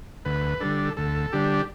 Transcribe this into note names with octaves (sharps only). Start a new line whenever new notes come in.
D2 B4
D3 G3 D4 A4
D2 A4
D3 G3 D4 G4